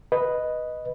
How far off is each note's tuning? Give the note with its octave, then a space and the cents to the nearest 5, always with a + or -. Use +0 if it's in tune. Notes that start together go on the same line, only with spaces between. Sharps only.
B4 +0 D#5 +0